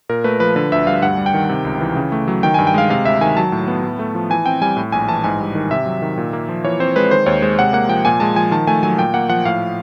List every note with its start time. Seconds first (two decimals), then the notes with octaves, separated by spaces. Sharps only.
0.09 A#2 A#4
0.24 A3 B4
0.40 F3 B4
0.56 D3 B4
0.72 D2 E5
0.87 G3 F5
1.02 G2 F#5
1.18 G3
1.26 G5
1.34 D#3
1.49 C3
1.65 C#2
1.81 E3
1.96 C#3
2.12 A3
2.28 F#3
2.43 D#3 G5
2.54 G2 G#5
2.67 G5
2.74 G#3 F5
2.90 C3 F5
3.05 D2 E5
3.21 D#3 G#5
3.37 F#3 A5
3.52 A2
3.67 B3
3.84 A2
3.99 A3
4.15 F3
4.30 E3 G#5
4.46 C4 G5
4.61 G3 G#5
4.77 A2
4.92 A#1 G#5
5.09 E3 A5
5.24 G#2 G#5
5.40 G3
5.55 D#3
5.71 C3 E5
5.86 F#3
6.02 D#3
6.18 A#2
6.33 A#3
6.49 F3
6.64 E3 C#5
6.80 C4 C5
6.96 G#3 B4
7.11 D#3 C5
7.26 D#2 C#5
7.42 G#3 C5
7.58 C3 F#5
7.73 A#3 F#5
7.89 F3 G5
8.05 A#2 G#5
8.20 G#3 A5
8.36 F3 G#5
8.51 D#3 A5
8.67 A3 G#5
8.83 F#3 G#5
8.98 A#2 G5
9.14 A#3 F#5
9.29 F3 F#5
9.45 A2 F5